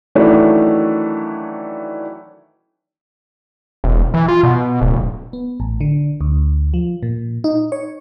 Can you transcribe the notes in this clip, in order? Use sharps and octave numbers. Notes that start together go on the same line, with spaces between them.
D#3 E3 F#3 A3 C#4 D4
E1
E3
F4
B2
D1
B3
A1
D3
D2
F3
A#2
D#4
C#5